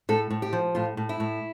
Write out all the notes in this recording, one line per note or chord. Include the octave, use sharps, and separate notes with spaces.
A2 A4
A2
G4
F3
A2 F4
A2
E4
A2